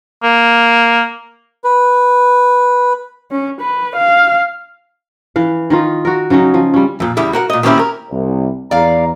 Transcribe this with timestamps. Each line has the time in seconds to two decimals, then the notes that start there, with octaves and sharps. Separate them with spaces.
0.23 A#3
1.64 B4
3.31 C#4
3.61 B4
3.96 F5
5.36 E3 F5
5.70 D#3 D#4 F4
6.05 F#4 A#4
6.30 C#3 F#3 C#4 D#4
6.54 F3
6.74 G3 C#4
7.00 F2 A#2
7.17 E2 C#3 G3 E4
7.33 F#4 A#4 F#5
7.50 A#2 D#5
7.63 D#3 A#3 C4 C#4 E4 G4
7.79 A#4
8.10 C2
8.71 E2 D5 F5 A#5